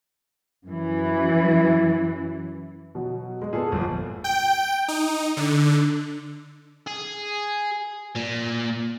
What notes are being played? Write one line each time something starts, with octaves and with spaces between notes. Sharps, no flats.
F#2 E3
B2 F#3
G#3
A#2 B3 G#4 A4
G1 F3
G5
D#4
D3
G#4
A#2